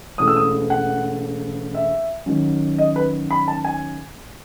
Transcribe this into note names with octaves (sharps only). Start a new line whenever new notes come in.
E1 E2 C#3 E3 A3 D#6
E6
D#6
F#5
E5
D#2 D#3 F#3 C#4
D#5
B4
B5
A5
G#5